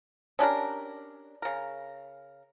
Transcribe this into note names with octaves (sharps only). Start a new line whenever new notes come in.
C#4 D4 G4 A#4
C#3 A#4